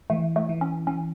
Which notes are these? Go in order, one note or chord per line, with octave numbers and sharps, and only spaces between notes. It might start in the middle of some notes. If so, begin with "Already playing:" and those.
E3 A3
A3
E3
C#4
E3 C#4